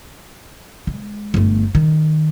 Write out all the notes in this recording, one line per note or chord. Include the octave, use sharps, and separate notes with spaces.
G#3
G1 A3
D#3